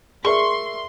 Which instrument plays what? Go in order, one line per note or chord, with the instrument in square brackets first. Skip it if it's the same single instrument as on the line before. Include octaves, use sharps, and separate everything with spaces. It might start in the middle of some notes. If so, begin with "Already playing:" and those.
[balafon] G#4 [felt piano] A#4 D5 E5 [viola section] C6 [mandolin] C#6